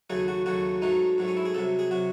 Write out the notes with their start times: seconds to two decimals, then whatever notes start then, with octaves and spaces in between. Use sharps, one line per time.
0.10 D#2 C#3 F#3 A3 G#4
0.28 F#4
0.46 D#2 C#3 F#3 A3 F#4
0.82 G#2 F#3 A3 D#4
1.18 G#2 F#3 A3
1.28 C#4
1.37 E4
1.45 G#4
1.54 C2 C3 F#3 A4
1.79 G#4
1.91 C3 F#3 F#4